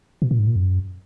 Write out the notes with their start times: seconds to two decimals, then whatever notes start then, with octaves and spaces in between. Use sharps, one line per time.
0.22 B2
0.31 A#2
0.39 G#2
0.47 A#2
0.56 F#2